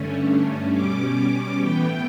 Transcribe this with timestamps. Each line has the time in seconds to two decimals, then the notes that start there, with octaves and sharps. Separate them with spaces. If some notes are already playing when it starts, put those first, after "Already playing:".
Already playing: G2 D3 A3 C#4
0.72 B2 G3 C#4 D6
1.58 A2 E3 B3 G5